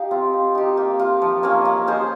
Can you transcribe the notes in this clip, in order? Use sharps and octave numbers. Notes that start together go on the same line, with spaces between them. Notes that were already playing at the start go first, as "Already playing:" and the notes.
Already playing: D#4 G4 F5
C4 F4
C4
D#4 G4
A#3
F4 A#4
F3
A#3 C#4 F4
A#3
D#4 G#4 C5